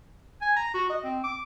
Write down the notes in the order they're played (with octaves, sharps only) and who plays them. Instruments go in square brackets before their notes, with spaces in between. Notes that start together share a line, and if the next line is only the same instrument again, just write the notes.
[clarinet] G#5
A#5
F#4
D#5
C4
D6